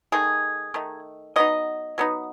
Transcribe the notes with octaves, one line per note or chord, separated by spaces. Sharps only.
D#3 A3 D#4 G#4
D#3 A3 D#4
F#3 B3 D#4 D#5
F#3 B3 D#4